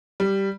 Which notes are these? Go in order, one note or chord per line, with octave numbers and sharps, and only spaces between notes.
G3